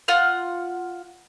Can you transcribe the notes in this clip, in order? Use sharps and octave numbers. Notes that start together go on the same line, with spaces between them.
F4 F#5 F6